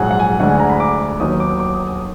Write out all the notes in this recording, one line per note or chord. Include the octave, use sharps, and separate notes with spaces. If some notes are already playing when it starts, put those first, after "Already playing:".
Already playing: A#1 G#2 F#3 F#5 G#5
F#5
G#5
D2 D3 G#3 F#5
G#5
A#5
B5
D6
D#2 D#3 F#3 B3 D#6
D6
D#6
D6
D#6
D#6